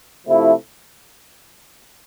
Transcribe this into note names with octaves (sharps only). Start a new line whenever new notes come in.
C3 F3 A3 E4